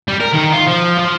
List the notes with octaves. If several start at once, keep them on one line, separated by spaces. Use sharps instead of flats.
G3
A#4
D#3
F4
F3
F3